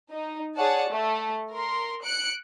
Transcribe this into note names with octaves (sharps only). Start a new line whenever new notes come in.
D#4
G#4 C#5 D5 F#5 A5
A3
A#4 C6
F#6 C#7 D7